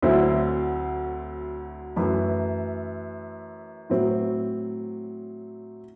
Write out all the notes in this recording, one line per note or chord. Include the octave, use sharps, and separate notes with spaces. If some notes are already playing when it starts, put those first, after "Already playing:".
D2 D3 F#3 C4 E4
F#2 E3 A3 E4
A2 F#3 C4